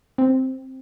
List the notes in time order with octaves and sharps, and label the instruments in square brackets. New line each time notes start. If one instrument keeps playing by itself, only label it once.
[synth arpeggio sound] C4